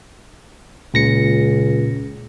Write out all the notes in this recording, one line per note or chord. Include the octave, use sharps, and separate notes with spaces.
C#2 A#2 A#6 C#7